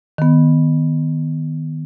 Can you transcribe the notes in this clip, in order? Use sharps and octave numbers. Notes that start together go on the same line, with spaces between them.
D#3 B3